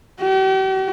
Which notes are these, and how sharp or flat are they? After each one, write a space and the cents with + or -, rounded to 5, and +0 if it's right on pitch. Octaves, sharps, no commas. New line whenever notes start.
G4 -45